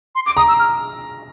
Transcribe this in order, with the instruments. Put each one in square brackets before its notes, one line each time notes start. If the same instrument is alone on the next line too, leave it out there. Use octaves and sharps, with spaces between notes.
[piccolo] C6
D6
[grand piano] A#5 [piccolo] D#6
[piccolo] E6
F6